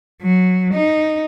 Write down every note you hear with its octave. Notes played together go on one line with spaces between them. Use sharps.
F#3
D#4